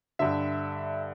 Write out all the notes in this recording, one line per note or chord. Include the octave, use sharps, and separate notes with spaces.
G2 D3 E5